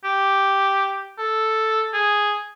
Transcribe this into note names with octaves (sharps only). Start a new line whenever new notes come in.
G4
A4
G#4